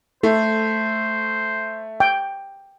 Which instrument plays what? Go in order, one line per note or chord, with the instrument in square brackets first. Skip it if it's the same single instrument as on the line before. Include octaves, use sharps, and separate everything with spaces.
[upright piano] A3 [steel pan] A4 [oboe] C5
[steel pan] G5